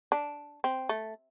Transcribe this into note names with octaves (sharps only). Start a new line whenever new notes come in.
D4
C4
A3